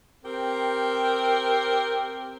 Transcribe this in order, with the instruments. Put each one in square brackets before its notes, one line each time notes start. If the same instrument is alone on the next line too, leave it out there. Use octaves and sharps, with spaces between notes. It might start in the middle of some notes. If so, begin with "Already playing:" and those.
[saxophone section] C4 G4 A#4